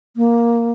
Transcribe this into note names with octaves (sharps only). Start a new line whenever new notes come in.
A#3